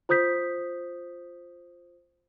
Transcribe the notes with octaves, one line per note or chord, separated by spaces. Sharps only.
F4 C5 D#6 G6 B6